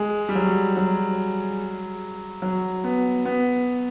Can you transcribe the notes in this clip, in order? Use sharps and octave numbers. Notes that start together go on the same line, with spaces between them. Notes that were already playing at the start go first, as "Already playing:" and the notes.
Already playing: G#3
G3
F#3
F#3
F#3
B3
B3